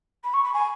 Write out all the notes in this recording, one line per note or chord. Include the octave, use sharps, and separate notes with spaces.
B5
C#6
B5
G#5